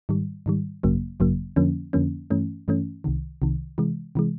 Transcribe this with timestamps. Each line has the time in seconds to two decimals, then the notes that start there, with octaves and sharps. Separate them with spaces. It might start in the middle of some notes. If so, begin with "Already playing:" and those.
0.09 G#2 D#3 G3
0.46 G#2 D#3 G3
0.83 G#1 F#2 C#3 F#3 A#3
1.20 G#1 F#2 C#3 F#3 A#3
1.56 F2 D3 F3 A#3 C#4
1.93 F2 D3 F3 A#3 C#4
2.30 G2 E3 A3 C#4
2.68 G2 E3 A3 C#4
3.04 C2 C3 D#3
3.42 C2 C3 D#3
3.78 C3 E3 G#3
4.15 C3 E3 G#3